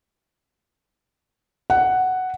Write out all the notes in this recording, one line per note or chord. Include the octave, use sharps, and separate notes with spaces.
F#5